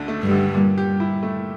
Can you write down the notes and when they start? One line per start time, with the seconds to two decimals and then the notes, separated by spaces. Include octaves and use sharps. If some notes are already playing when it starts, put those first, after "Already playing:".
Already playing: D2 D3 D4
0.08 A3
0.23 G2 G3
0.31 D3
0.54 A#2
0.78 G4
1.00 E4
1.23 A3